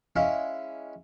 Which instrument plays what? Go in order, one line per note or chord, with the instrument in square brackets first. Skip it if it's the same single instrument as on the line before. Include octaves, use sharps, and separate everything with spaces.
[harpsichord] G#3 C#4 E4 E5 F5